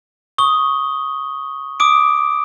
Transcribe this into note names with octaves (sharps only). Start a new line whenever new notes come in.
C#6 D#6 G7
D6 D#6 D7